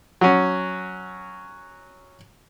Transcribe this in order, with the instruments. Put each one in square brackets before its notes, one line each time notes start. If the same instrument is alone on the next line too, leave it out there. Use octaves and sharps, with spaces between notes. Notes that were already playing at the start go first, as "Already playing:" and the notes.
[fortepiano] F#3 C#4